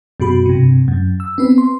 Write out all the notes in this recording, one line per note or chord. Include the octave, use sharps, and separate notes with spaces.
F#2 B2 F#4 B5
G2 C3
F#2
E6
B3 C4 B4
C6